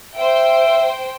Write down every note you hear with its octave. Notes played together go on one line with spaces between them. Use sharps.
C5 E5 G5